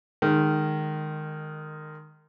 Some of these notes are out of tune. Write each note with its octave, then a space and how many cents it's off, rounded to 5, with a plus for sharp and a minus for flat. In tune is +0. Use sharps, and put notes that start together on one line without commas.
D#3 -20 G#3 +0